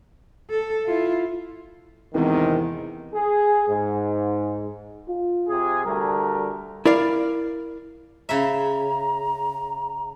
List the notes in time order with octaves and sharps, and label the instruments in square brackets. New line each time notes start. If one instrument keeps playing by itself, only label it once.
[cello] A4
E4 F4
[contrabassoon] E2 [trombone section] G#2 C3 D#3 [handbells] C4 A#4
[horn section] G#4
G#2
[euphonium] F4
[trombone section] C3 G#4
[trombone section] D2 A3 A#4 [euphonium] G3
[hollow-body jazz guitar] E4 A#4 D5 F5
[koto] C#3 E4 E5 [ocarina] A#5